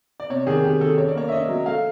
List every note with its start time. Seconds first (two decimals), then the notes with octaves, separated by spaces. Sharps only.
0.20 D5
0.30 C3 C#5
0.46 D#3 G#4
0.64 D#3 G4
0.81 D#3 A4
0.98 C#4 C#5
1.08 D5
1.15 A#3 C#5
1.28 E5
1.32 C#4 D#5
1.49 F#3
1.66 A3 F5